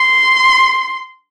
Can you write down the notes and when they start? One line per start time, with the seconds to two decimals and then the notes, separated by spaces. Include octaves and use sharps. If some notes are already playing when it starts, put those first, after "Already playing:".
Already playing: C6